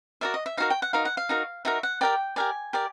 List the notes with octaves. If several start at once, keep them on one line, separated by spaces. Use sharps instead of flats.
F#4 A#4 D5 E5
D#5
E5
D#4 F#4 A#4 F5
G5
F#5
D#4 F#4 A#4 F5
F#5
F5
D#4 F#4 A#4
D#4 F#4 A#4 E5
F#5
G4 A#4 D5 G5
G4 A#4 D5 G#5
G4 A#4 D5